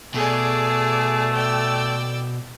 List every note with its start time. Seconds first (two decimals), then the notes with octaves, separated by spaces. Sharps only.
0.14 B2 A3 G#4 D5
1.33 D5 G5 E6